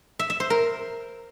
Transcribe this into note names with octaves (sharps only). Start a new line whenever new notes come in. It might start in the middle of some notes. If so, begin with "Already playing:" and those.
E5
E5
C5
A#4